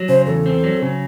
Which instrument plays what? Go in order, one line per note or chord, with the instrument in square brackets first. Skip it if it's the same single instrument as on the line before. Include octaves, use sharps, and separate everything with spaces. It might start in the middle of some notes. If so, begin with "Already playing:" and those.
Already playing: [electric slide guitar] F#3
[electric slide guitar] C#3 [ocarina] C5
[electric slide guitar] E2 [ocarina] A4
[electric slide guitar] C4
F#3
C#3